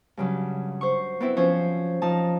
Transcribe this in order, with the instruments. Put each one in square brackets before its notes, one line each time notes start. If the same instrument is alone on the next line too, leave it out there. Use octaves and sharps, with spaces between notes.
[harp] G2 C#3 F#3
C5 C#6
B3 C4 E4
F3 C#4 C5 C#5
F3 D#4 A5